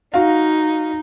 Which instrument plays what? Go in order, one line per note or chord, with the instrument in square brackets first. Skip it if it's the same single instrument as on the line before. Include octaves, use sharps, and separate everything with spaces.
[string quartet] D#4 [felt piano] F#4 F5